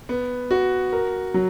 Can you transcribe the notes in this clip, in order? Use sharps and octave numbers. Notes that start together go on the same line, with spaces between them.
B3
F#4
A#4
F#3